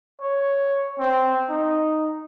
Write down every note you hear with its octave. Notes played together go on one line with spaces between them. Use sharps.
C#5
C4
D#4